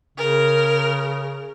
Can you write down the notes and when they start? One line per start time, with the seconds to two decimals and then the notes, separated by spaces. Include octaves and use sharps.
0.18 C#3 A#4